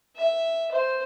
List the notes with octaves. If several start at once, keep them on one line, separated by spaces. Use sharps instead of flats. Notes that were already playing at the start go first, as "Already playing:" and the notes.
E5
C5